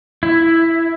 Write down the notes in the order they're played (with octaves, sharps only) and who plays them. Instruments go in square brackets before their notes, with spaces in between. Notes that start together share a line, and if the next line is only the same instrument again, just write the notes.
[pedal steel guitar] E4